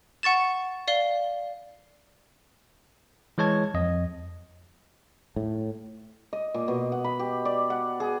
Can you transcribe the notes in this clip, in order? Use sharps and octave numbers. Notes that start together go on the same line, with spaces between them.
F#5 C#6 A6 E7
D5 F5 G7
E3 G#3 C#5 A5 G#6
F2 D#5
A2
D#5
A#2
B2
F#5
B5
G4
D5
F#5
G#4